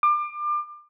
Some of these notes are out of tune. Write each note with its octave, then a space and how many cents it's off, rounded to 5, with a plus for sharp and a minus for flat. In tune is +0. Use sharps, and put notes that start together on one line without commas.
D6 +30